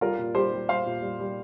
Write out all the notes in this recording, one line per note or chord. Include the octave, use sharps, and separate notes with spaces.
G3 F4 A#4
A#2
G3 G4 C5
G3
G3 C5 F5
A#2
G3
G3